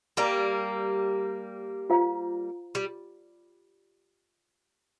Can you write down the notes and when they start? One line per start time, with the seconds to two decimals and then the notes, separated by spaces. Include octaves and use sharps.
0.17 G3 A#3 A#4 D5 F5 A#5
1.90 F4 C5 F5 A#5
2.75 G3